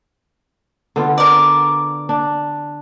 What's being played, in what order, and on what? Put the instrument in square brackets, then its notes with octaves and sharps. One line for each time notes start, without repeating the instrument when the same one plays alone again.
[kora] D3 B3 F4
[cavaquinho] A#4 D5
[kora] D4